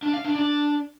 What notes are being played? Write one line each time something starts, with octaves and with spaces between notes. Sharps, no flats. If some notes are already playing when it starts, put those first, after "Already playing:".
D4
F5
D4
D4